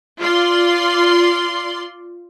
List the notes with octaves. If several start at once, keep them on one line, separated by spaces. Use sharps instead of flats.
F4 D5 C6